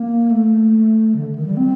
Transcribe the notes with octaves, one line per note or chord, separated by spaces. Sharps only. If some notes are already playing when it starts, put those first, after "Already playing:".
Already playing: A#3
A3
D3
D#3
G3
C4